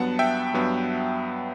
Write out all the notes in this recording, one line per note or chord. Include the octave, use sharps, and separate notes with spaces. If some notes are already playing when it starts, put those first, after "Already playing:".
Already playing: G2 F#3 B3 F#5 A5
E5 G5
G2 F#3 B3